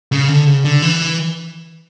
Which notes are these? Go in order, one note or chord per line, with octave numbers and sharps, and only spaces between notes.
C#3
D3
C#3
D3
E3